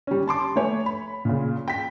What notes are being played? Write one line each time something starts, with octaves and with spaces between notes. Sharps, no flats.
G3 C#4
A5 C6 D6
A3 B4 C#5 G#5
B5
A#2 C#3
G5 B6